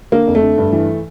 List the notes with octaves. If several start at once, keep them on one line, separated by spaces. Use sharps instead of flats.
D3 A#3
F2
A3
D3
G2
E3